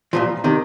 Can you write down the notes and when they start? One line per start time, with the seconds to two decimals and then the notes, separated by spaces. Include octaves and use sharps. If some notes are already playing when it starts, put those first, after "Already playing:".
0.13 C2 A#2 F3
0.44 C3 D#3